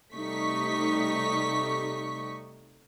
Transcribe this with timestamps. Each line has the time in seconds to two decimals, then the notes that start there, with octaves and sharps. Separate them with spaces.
0.13 C3 G3 A3 D#4 C#6 B6